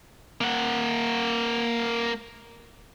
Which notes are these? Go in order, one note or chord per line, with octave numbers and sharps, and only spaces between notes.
A#3 F#5